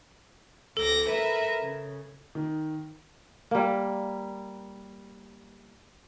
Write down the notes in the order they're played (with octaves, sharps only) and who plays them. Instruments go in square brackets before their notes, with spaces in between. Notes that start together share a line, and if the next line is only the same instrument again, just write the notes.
[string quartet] D2 D6 A#6 [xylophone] A4
[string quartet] A#4 B4 E5
C#3
[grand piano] D#3
[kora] G3 A#3